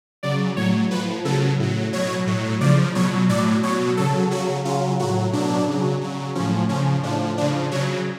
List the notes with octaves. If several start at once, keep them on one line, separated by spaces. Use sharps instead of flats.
C#3 F#3 D5
A2 F#3 C#5
A2 F3 B4
C#3 F#3 A4
A2 F#3
B2 F#3 C#5
A2 F#3
C#3 F3 D5
B2 F#3 C#5
A2 F#3 D5
B2 F#3 C#5
C#3 F#3 A4
C#3 F#3 F#4
C#3 F#3 F4
A2 F#3 F#4
B2 F#3 D4
C#3 F#3
C#3 F#3
A2 F3 C#4
C#3 F3 C#4
A2 F3 D4
C#3 F3 D4
C#3 F#3 C#5